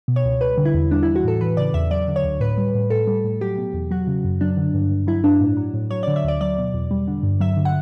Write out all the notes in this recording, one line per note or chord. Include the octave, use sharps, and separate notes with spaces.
B2
C#5
C#2
G3 B4
D3
E4
E2
G3 D4
E3 E4
F#4
A2 A4
E3 B4
C#3 D5
E2 E5
F#3 D5
D3
C#5
D2
A2 B4
G3
A2
A2 A4
G3
A2
F#3 G4
B2
E2
F#3 F#4
C#3
F#2
F#3 D4
D3
G2
G2
F#3 E4
G2 D4
A2
F#3
A2
F#3 C#5
D3 D5
E5
D2 D5
F#3 D5
B2
E2
G3
D3
G2
F#3 E5
D3
F#5